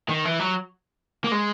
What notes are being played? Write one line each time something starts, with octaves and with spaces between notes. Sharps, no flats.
D#3
E3
F#3
A#3
G#3